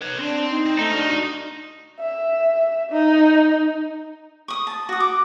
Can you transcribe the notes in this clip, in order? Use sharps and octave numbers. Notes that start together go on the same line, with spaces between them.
B4 C#5
C4 D4 C6
D#4
C4
A3 D#4
D4 F4 F#4
E5
D#4
C#6 D#6
A5
F#4 D#6
D6